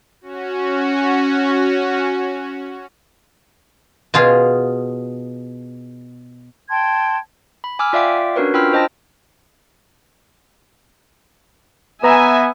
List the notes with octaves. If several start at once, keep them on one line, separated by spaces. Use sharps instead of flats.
C#4 F#4
B2 F4 G#4 F5
G5 A5 C6 G#6
B5
G#5 D6 E6 F6
F4 D5 E5 F5 G5 D6
C#4 D4 F#4 A#4 B4 C#5
D4 F4 G5 B5 E6 F6
C5 D#5 G5 A5 A#6
B3 B4 E5 G#5 A#5